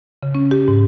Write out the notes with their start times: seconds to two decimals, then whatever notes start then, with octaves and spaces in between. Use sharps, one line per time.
0.23 C#3
0.35 C#4
0.51 G4
0.68 G#2